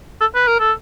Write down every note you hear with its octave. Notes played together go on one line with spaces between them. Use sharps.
A4
B4
A#4
A4